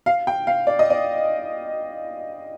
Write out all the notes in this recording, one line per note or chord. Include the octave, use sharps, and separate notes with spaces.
F5
G5
F5
D5
D#5
D5